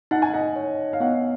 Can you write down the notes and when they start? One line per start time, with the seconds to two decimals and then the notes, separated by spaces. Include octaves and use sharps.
0.11 D#4 F#5
0.22 G#5
0.34 D#5 F#5
0.56 C#5
0.93 F5
1.00 B3 D#5 F#5